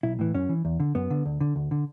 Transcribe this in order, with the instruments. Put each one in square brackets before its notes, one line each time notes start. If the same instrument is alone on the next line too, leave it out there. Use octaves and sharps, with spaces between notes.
[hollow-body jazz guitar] B1 E4
A2 E3
F#2 C#4
E3
E2
D3
F#2 B3
D3
D2
D3
D2
D3